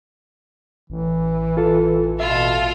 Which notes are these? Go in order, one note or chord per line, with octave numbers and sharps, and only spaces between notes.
A1 E3
F4 A4
B2 F4 A4 E5